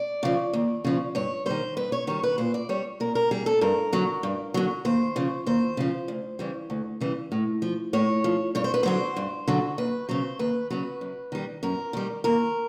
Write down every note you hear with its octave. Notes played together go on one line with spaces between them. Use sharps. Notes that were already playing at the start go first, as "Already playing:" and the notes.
Already playing: D5
C#3 F3
D#2
C#3 F3
G2 C#5
D#3 G3 C5
G2 B4
C#5
D#3 G3 C#5
B4
A#2 C5
D5
G3 C#5
A#2 A#4
A#4
G3 G#4
A4
G2 A#4
D3 F#3
G2
D3 F#3
D#2 C5
C#3 F3
D#2 C5
C#3 F3
D2
C#3 E3 G3
D2
C#3 E3 G3
A2
F3
A2 C#5
F3
G2 C#5
C5
B4
D3 F#3 C5
G2
D3 F#3
D#2 B4
C#3 F#3 C5
D#2 B4
C#3 F#3 B4
F#2
D#3 G3
F#2 A#4
D#3 G3
D#2 A#4